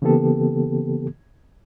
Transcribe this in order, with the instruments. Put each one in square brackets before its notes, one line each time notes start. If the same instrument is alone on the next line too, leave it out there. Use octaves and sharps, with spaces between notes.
[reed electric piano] C#3 E3 A#3 B3 G4 A4